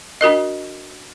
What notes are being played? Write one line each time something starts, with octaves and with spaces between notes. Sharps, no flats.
D4 F#4 A#4 D#5